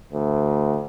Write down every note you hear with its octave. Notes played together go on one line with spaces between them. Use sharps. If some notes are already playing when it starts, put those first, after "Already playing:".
D2